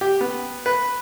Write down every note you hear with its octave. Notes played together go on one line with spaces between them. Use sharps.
G4
B3
B4